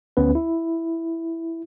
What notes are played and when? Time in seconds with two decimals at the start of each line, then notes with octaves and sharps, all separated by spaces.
0.17 D2 B3 C#4 B4
0.35 E4